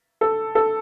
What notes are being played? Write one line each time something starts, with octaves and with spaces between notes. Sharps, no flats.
A4
A4